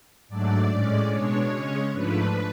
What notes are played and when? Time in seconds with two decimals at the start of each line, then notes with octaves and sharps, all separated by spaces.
0.28 G#2 F#3 A3 D4 D5
0.69 A2 G#3 C#4 D5
1.10 B2 G#3 D4 C#5
1.51 C#3 G#3 C#4
1.92 G#2 F3 A3 D4 B4